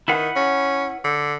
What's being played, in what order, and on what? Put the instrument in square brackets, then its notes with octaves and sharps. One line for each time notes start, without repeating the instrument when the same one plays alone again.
[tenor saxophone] D#3 [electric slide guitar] E4 B4 F#5
[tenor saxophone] C#4
D3